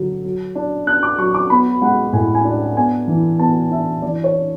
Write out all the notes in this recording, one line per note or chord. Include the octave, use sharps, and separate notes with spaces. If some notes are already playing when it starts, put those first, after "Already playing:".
Already playing: D3 F#3
F#3
D4
D4 F#6
D6
F#3 C#6
D6
B3 B5
G#3 F#5
A2 G#5
G#5
D4
B3 G#5
E3
B3 A5
D4 E5
E3 D5
C#5
D4